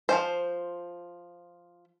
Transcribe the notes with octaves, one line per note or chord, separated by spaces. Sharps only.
F3 G#3 C5